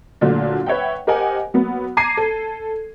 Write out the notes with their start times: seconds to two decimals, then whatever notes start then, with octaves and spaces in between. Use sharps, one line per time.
0.21 A#2 D3 F#3 A3 D4
0.66 B4 C#5 E5 F#5 G5
1.07 G4 A#4 C5 D#5 F#5 G#5
1.54 F#3 A#3 B3
1.97 A5 A#5 D6 G#6 C7 D#7
2.17 A4